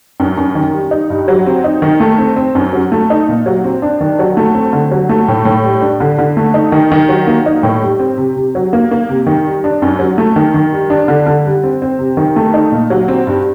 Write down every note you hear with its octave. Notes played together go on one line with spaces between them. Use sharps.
F#2
F#2
D#3
G3
D#4
G2
F#3
C4
D#4
D#3
A3
C4
C4
F#2
F#3
A3
D#4
A#2
F#3
C4
D4
D#3
F#3
A3
C4
D3
F#3
A3
A2
A2
G3
D4
D3
D3
A3
D#4
D#3
D#3
F#3
A#3
D#4
A2
G3
C4
C3
C3
F#3
A#3
A#3
C3
D#3
G3
D4
F#2
F#3
A3
D#3
D#3
G3
D4
D3
D3
G3
C4
C4
C3
D#3
A3
D#4
A#2
F#3
C4
G2